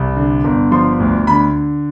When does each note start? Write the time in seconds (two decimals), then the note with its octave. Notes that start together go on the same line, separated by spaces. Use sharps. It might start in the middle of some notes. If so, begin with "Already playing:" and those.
Already playing: C2
0.17 D3
0.44 G1
0.72 F3 C6
1.00 D2
1.27 D3 B5